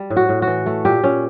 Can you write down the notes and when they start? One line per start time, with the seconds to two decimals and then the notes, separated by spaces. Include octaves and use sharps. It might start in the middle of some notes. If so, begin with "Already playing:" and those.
Already playing: G3
0.10 A2
0.17 F#4
0.29 A2
0.42 F#4
0.47 E3
0.66 A3
0.85 A#2 G4
1.04 A#2 C#4